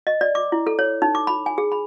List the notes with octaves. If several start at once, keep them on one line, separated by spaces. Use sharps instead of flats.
D#5
D5
D6
E4
A4
C#5
D#4
D6
B5
G#5
G#4
B5